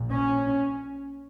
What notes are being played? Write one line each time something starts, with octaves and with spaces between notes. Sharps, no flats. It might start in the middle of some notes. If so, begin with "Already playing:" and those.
Already playing: A#1 A#2
C#4